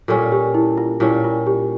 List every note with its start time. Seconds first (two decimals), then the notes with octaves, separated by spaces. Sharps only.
0.08 A#2 G3 C#4 A4
0.32 G4
0.54 E4
0.78 F4
1.00 A#2 G3 C#4 E4
1.24 F4
1.47 G4